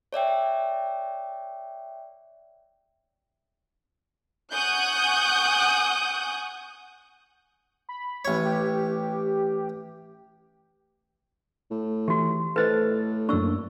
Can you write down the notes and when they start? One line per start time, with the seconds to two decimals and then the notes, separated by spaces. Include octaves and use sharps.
0.13 C#5 D5 E5 G5
4.53 F#5 G#5 C#6 D#6 F#6 G6
7.89 B5
8.25 A1 C#5
8.45 G4
11.71 A2
12.08 E3 F#4 G4
12.56 A2 A4 B4 C5 D#5 A6
13.29 F#2 A#3 D4 C#6 E6